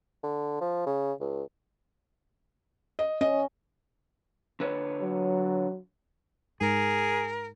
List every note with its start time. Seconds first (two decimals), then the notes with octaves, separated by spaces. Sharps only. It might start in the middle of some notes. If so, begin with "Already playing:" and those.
0.23 D3
0.61 F3
0.86 C#3
1.20 C#2
2.99 D#5
3.21 C#4 D#5
4.60 D3 B4 C#5
5.01 F#3
6.61 G#2 G#4 A#4